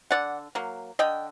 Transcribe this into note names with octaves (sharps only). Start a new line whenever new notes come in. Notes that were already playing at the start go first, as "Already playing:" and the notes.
D3 D5 F#5
F#3 A#3
D3 D#5 G5